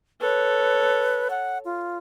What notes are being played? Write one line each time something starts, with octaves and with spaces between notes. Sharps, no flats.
A4 B4 C#5
F#5
F4